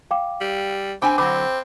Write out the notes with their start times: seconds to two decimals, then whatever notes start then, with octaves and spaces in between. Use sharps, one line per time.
0.11 F5 G5 D6
0.41 G3
1.02 C4 D4 G5 G#5 B5 D6
1.18 D3 F#3 C4 B5 D6